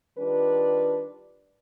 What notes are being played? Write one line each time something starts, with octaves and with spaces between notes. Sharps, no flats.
D#3 G3 D4 F4 B4